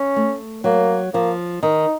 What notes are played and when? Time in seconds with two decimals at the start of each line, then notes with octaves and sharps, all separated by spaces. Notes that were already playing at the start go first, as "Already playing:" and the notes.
Already playing: C#4
0.16 A3
0.64 F#3 A#3
1.14 F3 A#3
1.62 D#3 D#4